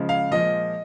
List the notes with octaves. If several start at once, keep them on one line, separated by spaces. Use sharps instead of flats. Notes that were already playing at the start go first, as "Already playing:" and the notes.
Already playing: C#3 F3 G#3
F5
A#2 F3 G#3 D#5